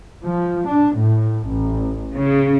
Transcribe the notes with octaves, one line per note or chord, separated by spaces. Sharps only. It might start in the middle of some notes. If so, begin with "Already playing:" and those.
F3
D4
A2
A1
C#3